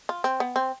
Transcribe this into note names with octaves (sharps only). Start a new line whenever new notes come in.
F4
C4
B3
C4